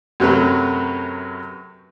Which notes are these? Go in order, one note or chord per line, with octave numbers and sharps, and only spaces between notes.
F#2 C3 F#3 A3 B4